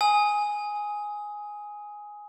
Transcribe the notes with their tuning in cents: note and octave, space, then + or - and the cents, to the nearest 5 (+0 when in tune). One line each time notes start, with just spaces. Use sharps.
G#5 +0 D#6 +20